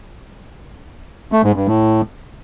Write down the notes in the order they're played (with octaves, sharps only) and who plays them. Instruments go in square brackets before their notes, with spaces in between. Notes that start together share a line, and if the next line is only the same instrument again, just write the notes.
[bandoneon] A3
G#2
G2
A2